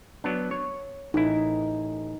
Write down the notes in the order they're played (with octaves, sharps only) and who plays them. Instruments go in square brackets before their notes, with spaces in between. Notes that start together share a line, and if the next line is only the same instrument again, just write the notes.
[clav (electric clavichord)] F#3 B3 D4
C#5
[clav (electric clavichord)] A1 E4 [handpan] D#4